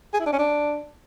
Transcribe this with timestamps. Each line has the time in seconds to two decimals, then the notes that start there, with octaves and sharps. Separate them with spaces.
0.13 G#4
0.20 E4
0.26 D4
0.32 C#4
0.39 D4